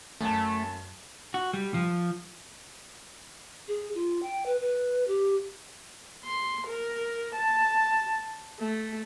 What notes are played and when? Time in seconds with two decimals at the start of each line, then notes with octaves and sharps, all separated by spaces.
0.21 F#2 A3 A5
1.34 F#4
1.53 G3
1.74 F3
3.68 G#4
3.95 F4
4.23 G5
4.46 B4
4.61 B4
5.08 G4
6.25 C6
6.67 A#4
7.35 A5
8.59 A3